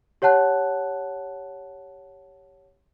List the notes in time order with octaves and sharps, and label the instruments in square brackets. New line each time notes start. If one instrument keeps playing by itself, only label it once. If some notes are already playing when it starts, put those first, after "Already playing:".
[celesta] G4 C#5 F#5 A5 F#6